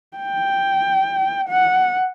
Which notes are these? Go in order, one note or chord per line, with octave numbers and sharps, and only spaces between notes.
G5
F#5